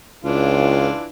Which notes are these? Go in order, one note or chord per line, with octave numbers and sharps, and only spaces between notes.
C#2 E3 D4 F4